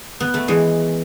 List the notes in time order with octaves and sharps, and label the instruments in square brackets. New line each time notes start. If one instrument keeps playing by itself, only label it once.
[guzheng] B3
A3
E3 G#3